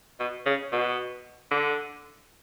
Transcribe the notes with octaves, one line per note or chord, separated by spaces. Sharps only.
B2
C#3
B2
D3